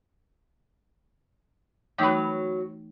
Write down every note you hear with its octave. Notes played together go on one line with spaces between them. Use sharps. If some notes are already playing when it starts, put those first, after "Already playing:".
E3 F#3 A3 D#4 B4